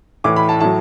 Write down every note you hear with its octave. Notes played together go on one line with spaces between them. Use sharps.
A2 E3 D6
B5
A5
A2 F#3 A5